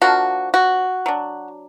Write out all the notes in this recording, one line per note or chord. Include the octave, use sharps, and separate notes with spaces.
F3 A#3 D4 F#4
F#4
F#3 D4